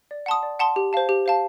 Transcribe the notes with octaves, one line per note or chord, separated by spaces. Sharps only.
D5
F#5 A5 C6 D#6
D5
F#5 A5 C6 D#6
G4
C5 F5 A5
G4
C5 F5 A5